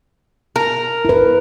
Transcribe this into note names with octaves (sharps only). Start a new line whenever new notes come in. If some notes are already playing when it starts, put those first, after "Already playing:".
A#4
E4 B4